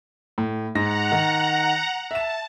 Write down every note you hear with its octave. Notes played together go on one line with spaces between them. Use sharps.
A2
G#2 F#5 A#5 A#6
D#3
E5 A5 E7